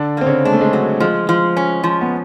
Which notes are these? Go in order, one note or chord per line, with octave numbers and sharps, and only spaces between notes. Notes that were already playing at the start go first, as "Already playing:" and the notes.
Already playing: D3 D4
A#3 C4
C#3 C#4
G#3 D4
A3
G#3
F#3
F3 G#3
F3
C#4
F3
B3